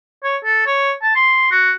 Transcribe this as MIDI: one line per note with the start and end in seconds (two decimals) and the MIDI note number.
0.23 0.37 73
0.44 0.65 69
0.67 0.93 73
1.03 1.12 81
1.16 1.48 84
1.51 1.73 66